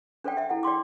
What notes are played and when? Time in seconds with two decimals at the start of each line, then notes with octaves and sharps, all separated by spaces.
0.24 D4 A4 C5 D5 G5
0.37 E5 G5
0.49 E4 A4 F#5
0.63 D5 G5 C6 D6